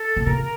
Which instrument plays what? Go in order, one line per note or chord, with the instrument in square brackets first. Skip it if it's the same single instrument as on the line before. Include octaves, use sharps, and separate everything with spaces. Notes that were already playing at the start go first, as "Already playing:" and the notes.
Already playing: [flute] A4
[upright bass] C3
[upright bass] C#3 [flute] A#4